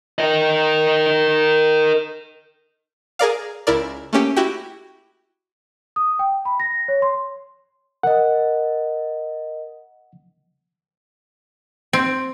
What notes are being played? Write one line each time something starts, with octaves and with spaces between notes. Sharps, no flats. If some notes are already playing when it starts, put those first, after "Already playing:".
A#4 D#5
G#4 A#4 D5 F5
C#2 E4 A#4 D5
A3 A#3 C#4 G4
E4 F#4 G4 G5
D#6
G5
B5
A#6
C#5
C6
A#4 D#5 F#5
C4